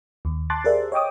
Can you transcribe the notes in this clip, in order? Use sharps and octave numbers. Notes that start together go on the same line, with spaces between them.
D#2
A5 C6 D6 F#6 A6
G4 G#4 A#4 C5 D5 E5
C#5 D#5 G5 D6 D#6